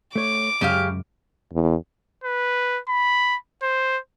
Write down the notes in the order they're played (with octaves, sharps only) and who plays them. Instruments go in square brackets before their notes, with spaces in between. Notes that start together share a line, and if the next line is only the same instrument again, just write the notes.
[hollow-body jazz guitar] A3 C#5 [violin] D6
[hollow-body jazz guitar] C#2 F#2 [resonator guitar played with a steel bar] C#3 G4 F5
[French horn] E2
[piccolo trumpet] B4
B5
C5